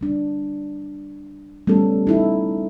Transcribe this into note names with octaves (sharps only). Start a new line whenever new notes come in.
G3 D4
G3 A3 B3 C#4 A4
D#4 E4 A4